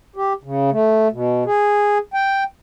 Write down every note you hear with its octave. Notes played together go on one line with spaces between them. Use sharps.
G4
C#3
A3
B2
G#4
G5